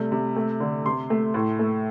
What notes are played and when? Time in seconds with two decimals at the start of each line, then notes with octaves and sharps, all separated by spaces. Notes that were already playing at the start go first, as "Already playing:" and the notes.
Already playing: C3 G3 A3
0.12 C3
0.36 A3
0.60 D3
0.86 C3 C6
1.10 A3
1.34 A2
1.59 A3